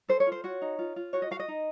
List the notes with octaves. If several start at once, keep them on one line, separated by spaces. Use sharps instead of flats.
A4 C5
C#5
F4
C5
F#4 C#5
D#4
F4
F4
F#4 C#5
D#5
F#4 F5
D#5
D#4